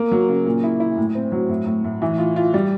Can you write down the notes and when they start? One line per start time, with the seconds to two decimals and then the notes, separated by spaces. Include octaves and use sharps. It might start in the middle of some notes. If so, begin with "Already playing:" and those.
Already playing: A#3
0.12 F#3
0.29 C#3
0.46 A#2
0.64 E4
0.80 E4
0.97 A2
1.15 C4
1.32 F#3
1.49 A2
1.66 A2
1.84 A2
2.02 E3
2.18 F4
2.36 F4
2.54 G3